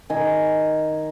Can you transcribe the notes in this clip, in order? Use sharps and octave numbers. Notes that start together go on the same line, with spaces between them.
D#3 G#5